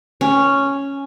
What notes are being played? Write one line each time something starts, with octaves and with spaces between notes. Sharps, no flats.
C#4